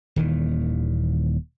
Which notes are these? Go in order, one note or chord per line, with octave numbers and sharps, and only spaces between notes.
D#1 D#2 D#3 E3